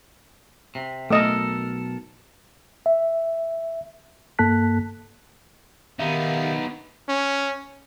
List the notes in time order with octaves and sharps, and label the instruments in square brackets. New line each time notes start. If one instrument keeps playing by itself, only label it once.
[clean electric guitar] C3
[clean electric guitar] B1 A4 A#4 [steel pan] A3 D#5
[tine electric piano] E5
G2 A#3 A4 A5 F#6 B6
[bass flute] D#3 [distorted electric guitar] B3 D#4 [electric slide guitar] G4 E5 [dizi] F5
[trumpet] C#4